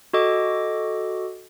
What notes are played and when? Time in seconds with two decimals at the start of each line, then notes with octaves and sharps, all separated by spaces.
0.13 F#4 A4 D#5 D6